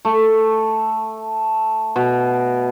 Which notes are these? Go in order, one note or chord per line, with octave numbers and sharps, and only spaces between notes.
A3
B2